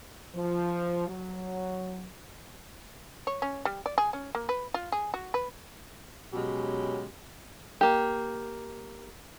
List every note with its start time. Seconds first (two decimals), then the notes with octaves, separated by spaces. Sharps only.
0.35 F3
1.09 F#3
3.27 C#5
3.42 C#4
3.65 G3
3.86 D5
3.98 G#4
4.13 C#4
4.35 A#3
4.49 B4
4.74 F4
4.92 G#4
5.14 F#4
5.34 B4
6.33 B2 F#3 G#3 C#4 G4
7.81 A#3 G4